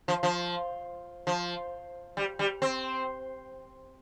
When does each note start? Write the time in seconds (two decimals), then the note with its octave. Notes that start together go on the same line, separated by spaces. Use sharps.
0.08 F3
0.23 F3
1.27 F3
2.17 G3
2.39 G3
2.62 C4